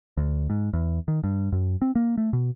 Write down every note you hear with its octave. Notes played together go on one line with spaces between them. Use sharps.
D2
G#2
E2
D#3
G2
F#2
C4
A#3
A3
B2